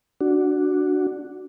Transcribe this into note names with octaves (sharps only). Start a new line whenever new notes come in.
D4 F#4